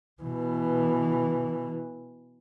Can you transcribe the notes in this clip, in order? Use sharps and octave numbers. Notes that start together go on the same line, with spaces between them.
B2 E3